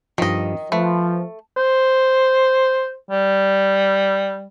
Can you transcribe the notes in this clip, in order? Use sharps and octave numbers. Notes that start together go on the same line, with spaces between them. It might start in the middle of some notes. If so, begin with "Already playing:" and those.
G2 D#3 F3 D#5
F3 A3 B4
C5
G3